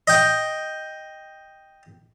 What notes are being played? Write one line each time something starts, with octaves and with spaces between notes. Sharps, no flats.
D#5 G5